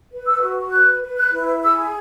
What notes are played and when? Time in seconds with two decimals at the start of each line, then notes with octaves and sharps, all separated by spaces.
0.11 B4
0.26 E6
0.41 F#4
0.72 B4 F#6
1.02 B4
1.16 F#6
1.32 E4
1.62 G#4 E6